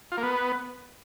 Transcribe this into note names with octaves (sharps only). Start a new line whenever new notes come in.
F4
A#3
B3